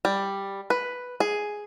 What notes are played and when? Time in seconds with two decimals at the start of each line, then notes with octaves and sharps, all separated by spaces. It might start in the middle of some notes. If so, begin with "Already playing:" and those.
0.05 G3
0.70 B4
1.20 G#4